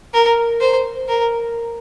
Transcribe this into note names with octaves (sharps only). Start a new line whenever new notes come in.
A#4
C5
A#4